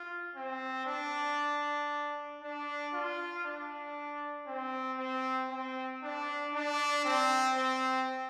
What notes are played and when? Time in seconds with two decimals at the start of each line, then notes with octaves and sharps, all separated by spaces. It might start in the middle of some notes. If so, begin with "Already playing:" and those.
Already playing: F4
0.35 C4
0.86 D4
2.42 D4
2.93 F4
3.44 D4
4.47 C4
4.98 C4
5.51 C4
6.02 D4
6.54 D4
7.05 C4
7.57 C4